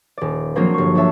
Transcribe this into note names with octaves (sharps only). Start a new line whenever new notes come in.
D#1 D5
F3 F#3 A#3 C4 D4 F4
G1 C#6
D4 F4 F#4 C#5 E5 A5